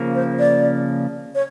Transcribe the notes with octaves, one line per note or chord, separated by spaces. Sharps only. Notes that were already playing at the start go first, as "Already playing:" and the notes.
Already playing: C#3 F3 A#3
C5
D5
C#5